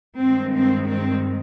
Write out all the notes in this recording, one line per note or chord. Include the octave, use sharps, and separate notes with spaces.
G2 D#3 G#3 C4
C4
C4